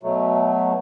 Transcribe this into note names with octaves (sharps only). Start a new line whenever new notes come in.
B2 F#3 A3